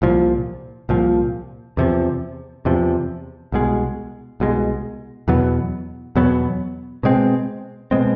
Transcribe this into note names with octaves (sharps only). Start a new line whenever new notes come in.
C2 A#2 F3
C2 A#2 F3
E2 C3 F3
E2 C3 F3
C2 B2 G#3
C2 B2 G#3
E2 B2 F#3 B3
E2 B2 F#3 B3
B2 G#3 C4
B2 G#3 C4